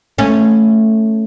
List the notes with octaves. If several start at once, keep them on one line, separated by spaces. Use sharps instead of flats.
A3 C#4